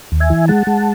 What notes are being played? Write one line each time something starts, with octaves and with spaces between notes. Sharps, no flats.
D#2
E5 G#5
E3
G#3 F#5 A5
G#3